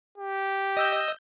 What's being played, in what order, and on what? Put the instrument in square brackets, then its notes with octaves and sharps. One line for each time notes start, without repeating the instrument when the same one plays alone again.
[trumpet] G4
[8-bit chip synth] D#5 E6 G6